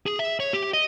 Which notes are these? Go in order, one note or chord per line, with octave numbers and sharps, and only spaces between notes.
G#4
E5
C#5
G4
D#5